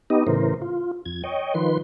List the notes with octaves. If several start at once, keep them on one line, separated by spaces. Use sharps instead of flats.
B3 D#4 G4 D#5
A2 C#3 E3 A#4 C5
F4
F2 G#6
C#5 D#5 G5
D#3 F3 B4 C6